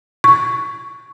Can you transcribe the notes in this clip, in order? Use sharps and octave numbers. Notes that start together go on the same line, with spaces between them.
C#6